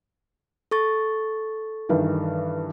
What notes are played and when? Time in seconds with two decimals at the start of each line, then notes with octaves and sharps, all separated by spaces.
0.71 A4 C#6 A6
1.89 G2 D#3 E3